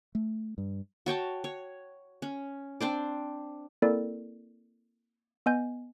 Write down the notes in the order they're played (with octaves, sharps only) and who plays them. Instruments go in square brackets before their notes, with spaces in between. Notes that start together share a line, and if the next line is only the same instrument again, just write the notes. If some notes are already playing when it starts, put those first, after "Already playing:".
[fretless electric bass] A3
G2
[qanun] F#4 C#5 G5 A5
C#5
C#4
C4 D4 C5 D5
[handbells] A#3 C4 E4 A4 A#4 D5
B3 D#5 G#5 G6